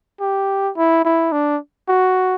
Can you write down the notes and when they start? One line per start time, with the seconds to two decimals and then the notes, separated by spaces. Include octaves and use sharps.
0.20 G4
0.77 E4
1.05 E4
1.32 D4
1.89 F#4